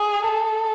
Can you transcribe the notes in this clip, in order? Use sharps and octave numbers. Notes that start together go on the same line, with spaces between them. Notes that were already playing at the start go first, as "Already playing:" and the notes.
Already playing: G#4
A4